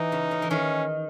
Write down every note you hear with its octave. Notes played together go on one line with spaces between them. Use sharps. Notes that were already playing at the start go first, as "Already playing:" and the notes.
Already playing: E3 D#4
C#3
C#3
E3
D#3 C#4